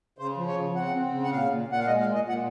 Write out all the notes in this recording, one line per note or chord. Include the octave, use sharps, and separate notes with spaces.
C#3 C5
F3
C#5
C#3
C4 F#5
C4
C#3
F#5
A#2 F5
A#2
A#2 F#5
F5
G#3 D#5
F5
A#2
D#5
A#2
F#5